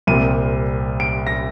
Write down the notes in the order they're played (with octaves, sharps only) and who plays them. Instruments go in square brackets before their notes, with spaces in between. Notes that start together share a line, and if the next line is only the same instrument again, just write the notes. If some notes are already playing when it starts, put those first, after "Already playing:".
[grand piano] C2 A#2 G3 C4 D#7
D7
A#6